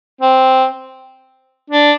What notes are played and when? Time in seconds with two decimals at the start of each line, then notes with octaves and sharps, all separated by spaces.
0.21 C4
1.70 D4